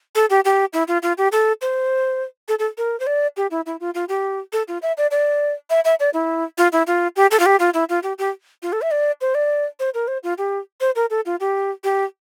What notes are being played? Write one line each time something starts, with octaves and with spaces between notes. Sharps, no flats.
A4
G4
G4
E4
F4
F4
G4
A4
C5
A4
A4
A#4
C5
D5
G4
E4
E4
F4
F4
G4
A4
F4
E5
D5
D5
E5
E5
D5
E4
F4
E4
F4
G4
A4
F4
G4
F4
E4
F4
G4
G4
F4
A4
E5
D5
C5
D5
C5
A#4
C5
F4
G4
C5
A#4
A4
F4
G4
G4